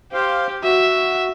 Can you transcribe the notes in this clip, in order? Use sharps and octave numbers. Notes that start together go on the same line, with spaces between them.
G4 C5 F5
F#4 E5